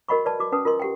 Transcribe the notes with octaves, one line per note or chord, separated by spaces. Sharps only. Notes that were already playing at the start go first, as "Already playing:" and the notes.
F#4 A#4 D#5 F#5 B5 C#6
B4 D5 A5
F#4 D6
C#4 B4 F#5 A5 D#6
F4 A#4 D#5 C6
G4 F#5 G5